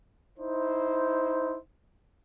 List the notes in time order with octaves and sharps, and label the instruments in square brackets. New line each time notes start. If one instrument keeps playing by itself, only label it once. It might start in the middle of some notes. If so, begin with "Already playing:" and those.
[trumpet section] D#4 E4 C5